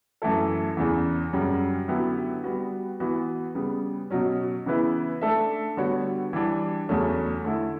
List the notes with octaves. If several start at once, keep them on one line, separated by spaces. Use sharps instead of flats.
F#2 E3 A3 E4 A4
E2 C#3 E3
F#2 C#3 G3 C#4 F#4
D3 F#3 B3 E4 G4
G3 B3 F#4
E3 B3 F#4
C#3 G3 B3
B2 F#3 C#4
C#3 E3 B3 E4 B4
A3 D4 A4 E5
D3 G3 B3 F#4 C#5
E3 G3 D4
E2 C#3 F#3 A3 C#4
D3 A3 E4